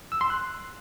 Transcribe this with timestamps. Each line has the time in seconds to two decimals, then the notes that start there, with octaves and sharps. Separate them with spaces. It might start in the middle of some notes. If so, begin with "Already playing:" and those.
0.12 E6
0.21 C6
0.30 F#6